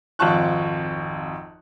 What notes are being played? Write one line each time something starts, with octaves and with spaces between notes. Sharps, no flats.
G#1 F2 F4 A5 C#6 F#6